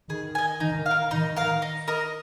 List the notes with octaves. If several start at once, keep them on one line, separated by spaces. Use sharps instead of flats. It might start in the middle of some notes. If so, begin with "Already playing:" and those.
D#3 G#4
D#5 G#5
D#3 D#4
F5
A#4
D#3 D#4
A#4 F5
D#4
A#4 D#5